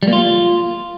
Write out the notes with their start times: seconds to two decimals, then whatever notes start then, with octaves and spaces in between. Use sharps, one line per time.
0.03 G3
0.08 A#3
0.13 F4